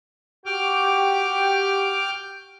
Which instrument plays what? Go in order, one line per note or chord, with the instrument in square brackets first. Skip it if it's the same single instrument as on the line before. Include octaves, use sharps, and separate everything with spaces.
[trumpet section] F#4 G4 [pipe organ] G5 D6 F6